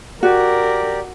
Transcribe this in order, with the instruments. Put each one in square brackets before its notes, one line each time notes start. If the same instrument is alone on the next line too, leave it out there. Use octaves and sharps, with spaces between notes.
[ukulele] F#4 [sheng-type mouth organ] G4 D5 [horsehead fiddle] A#4